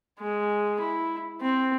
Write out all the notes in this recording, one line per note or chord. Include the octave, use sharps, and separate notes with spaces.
G#3
E4
C4